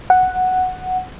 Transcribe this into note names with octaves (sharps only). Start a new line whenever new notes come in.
F#5